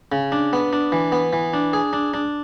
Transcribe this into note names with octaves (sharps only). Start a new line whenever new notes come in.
C#3
D4
B3
D4
E3
B3
E3
D4
G#4
D4
D4